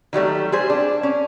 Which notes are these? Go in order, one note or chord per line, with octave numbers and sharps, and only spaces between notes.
D#3 F#3 G3 A3
G3 G#4 C5
D4
C#4